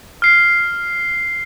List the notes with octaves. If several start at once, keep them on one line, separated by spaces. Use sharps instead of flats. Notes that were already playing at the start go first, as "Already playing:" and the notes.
F6 C7